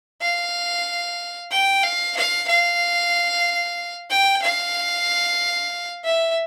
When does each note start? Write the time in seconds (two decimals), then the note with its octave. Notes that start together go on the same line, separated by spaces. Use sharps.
0.21 F5
1.51 G5
1.83 F5
2.16 F5
2.48 F5
4.10 G5
4.42 F5
6.04 E5